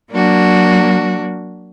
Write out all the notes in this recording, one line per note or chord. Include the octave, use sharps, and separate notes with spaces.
F#3 A#3 D4 F#4